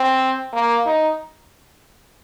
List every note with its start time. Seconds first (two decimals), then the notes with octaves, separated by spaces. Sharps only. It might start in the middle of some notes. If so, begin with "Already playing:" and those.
Already playing: C4
0.53 A#3
0.86 D#4